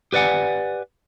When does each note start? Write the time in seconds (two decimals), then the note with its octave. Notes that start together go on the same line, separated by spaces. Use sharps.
0.13 G4 B4 D5 F#5 G#5